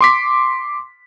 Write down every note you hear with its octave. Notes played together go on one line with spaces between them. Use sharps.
C6 D6 B6